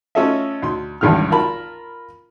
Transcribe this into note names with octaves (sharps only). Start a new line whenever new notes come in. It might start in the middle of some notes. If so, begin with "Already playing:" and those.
A3 C#4 F4 A4 D#5 E5
D2 C6
G#1 C#2 G2 D3 E3 F6
F4 A#4 A5 B5